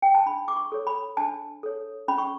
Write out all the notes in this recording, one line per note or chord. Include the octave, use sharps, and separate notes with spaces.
G5
A5
D4 B5
D6
C#6
A4 C#5
B5
D4 A5
A4 C#5
C#4 B5
C#6